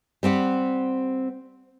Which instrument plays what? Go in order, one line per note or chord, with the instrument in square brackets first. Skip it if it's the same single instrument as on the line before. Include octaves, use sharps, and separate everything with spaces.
[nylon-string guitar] G3 C4 G4 F#5